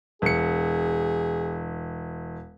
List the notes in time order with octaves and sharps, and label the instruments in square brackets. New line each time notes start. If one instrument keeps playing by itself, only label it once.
[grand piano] E1 C#7 [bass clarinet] G#4